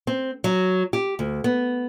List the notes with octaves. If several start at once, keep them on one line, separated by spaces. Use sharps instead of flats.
C4
F#3
G4
D2
B3